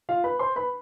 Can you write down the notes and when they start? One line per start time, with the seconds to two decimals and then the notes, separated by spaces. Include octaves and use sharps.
0.09 F4 F5
0.24 B4 B5
0.39 C5 C6
0.56 B4 B5